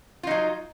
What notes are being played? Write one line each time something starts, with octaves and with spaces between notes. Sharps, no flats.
F#3 D#4 F4